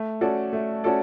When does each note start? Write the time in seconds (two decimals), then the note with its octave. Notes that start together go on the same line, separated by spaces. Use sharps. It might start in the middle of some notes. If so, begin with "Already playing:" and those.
Already playing: A3
0.21 C#4 F#4 A4 D5
0.53 A3
0.84 C#4 F#4 A4 D5